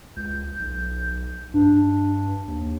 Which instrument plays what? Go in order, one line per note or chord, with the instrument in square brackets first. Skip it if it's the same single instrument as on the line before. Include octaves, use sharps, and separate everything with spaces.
[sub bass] C#2 [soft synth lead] G6
[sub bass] B1
[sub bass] G2 [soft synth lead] D4
[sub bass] D#2